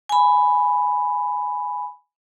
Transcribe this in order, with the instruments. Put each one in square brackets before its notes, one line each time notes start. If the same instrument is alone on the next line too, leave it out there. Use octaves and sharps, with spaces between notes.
[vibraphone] G#5 B5